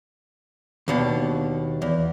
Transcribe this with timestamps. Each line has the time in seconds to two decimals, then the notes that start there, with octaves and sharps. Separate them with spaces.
0.88 D#2 B2 D4
1.82 E2